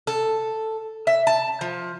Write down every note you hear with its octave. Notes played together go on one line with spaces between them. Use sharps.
A4
E5
A5
F3